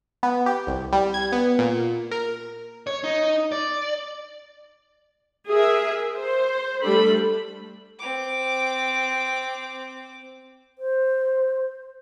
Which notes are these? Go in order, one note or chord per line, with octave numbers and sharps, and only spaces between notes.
B3
G4
C2
G3
G#6
B3
A#2
A#4
C#5
D#4
D5
G#4 A#4 E5
C5
G3 A3 D4 A4 B5
C4 D6
C5